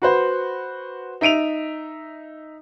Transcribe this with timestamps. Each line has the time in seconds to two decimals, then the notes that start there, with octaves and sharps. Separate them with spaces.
0.02 F#4 B4 C5
1.21 D#4 E5 D7 D#7 F7